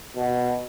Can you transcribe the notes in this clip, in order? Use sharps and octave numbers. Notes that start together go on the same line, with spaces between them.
B2